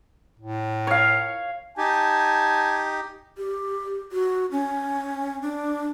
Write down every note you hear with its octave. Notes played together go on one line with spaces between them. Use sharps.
A2
C#5 F5
D#4 G4 G#5 A5
G4
F#4
C#4
D4